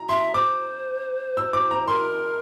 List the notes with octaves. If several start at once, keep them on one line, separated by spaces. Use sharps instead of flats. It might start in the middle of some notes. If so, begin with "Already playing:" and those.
Already playing: A#5
E5 C6
C5 D6
E6
D6
A#5
A#4 C6